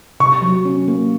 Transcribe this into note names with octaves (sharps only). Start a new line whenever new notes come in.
C3 C#6
F#3
C#4
A#3